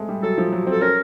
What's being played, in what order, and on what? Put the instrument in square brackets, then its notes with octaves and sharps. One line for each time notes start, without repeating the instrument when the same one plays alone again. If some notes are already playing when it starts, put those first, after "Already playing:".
Already playing: [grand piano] G#3 A3 C4
G3
[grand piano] F#3 [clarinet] A4
[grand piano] F3
F#3
[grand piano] C4 [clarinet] A4
[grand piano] C#4 [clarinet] A#4